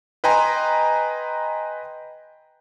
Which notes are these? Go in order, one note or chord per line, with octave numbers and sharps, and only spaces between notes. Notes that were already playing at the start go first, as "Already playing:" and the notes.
B4 D#5 G5 G#5 A#5 C6